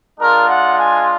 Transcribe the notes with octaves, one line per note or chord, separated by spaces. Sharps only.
G#3 D4 F4 A#4
F#5
G#5